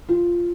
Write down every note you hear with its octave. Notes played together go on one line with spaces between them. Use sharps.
F4